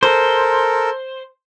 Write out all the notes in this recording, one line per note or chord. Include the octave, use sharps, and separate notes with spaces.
A4 A#4 C5